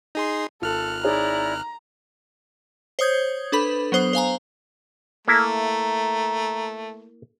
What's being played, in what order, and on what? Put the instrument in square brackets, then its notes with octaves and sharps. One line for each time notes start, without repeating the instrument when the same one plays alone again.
[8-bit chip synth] D#4 G#4 C6
[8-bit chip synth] G#1 F6 F#6 [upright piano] F4 [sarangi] A4
[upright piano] D#4 G#4 C#5 [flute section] E4 D5 [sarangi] A#5
[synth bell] C5 C#5 D#6 G6 G#6
D4 A4 B4 B5
F#3 B3 C5 D#6
C5 F5 G#5 A#5
[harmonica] A3 [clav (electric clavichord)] A#3 E4 [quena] A#5